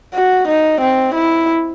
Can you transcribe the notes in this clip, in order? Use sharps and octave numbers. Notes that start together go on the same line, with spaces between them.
F#4
D#4
C4
E4